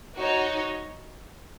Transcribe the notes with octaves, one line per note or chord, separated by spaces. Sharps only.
D#4 F#4 C#5